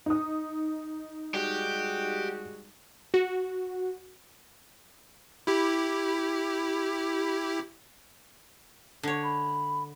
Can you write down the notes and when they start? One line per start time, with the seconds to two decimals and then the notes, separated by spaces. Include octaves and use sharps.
0.06 D#4 D#6
1.35 G3 G#3 F#4 G4
3.14 F#4
5.47 E4 G4
9.03 D3 C#5
9.23 B5